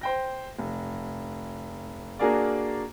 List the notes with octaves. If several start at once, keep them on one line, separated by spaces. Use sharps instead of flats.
C5 G5 A#6
F1
A#3 D4 F#4 G#4 A#4 D5